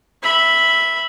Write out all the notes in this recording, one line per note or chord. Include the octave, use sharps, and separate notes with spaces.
E5 B5